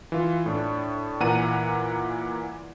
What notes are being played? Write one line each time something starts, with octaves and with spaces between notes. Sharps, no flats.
E3 F4
A2 D4
A#2 E3 F#5 A#5 D#7